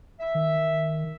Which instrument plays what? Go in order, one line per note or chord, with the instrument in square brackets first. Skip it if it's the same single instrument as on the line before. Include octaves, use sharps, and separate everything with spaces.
[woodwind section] E5
[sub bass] D#3